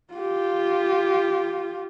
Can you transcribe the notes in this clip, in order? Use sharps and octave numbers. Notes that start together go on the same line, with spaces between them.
F4 G4